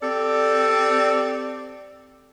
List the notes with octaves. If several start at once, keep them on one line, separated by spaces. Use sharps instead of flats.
C4 G4 A4 D5